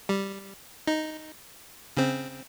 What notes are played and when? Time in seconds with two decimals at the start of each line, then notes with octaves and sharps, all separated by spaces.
0.09 G3
0.88 D#4
1.97 C#3 C4